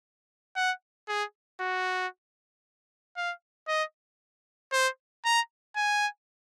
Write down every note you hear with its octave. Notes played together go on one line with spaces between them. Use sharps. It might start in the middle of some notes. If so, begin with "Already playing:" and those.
F#5
G#4
F#4
F5
D#5
C5
A#5
G#5